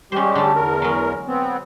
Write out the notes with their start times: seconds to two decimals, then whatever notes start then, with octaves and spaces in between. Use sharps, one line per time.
0.12 G3 G#3 C#4 G4 C5
0.35 D3 A3
0.56 E2 A#4
0.82 F#3 G#3
1.27 B3 C4